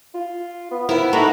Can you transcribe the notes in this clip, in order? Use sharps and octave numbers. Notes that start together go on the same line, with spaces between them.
F4
B3
B3 C4 E4 A#4
A#3 D#4 F#4 A4 A#5 B5